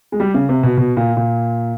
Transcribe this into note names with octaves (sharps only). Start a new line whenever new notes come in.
G#3
G3
C#3
C3
B2
B2
A#2
A#2